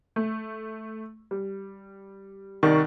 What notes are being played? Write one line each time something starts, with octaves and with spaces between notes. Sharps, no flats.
A3
G3
C2 D#3 D5 C#6